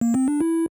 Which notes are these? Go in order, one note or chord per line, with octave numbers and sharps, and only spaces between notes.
A#3
C4
D4
E4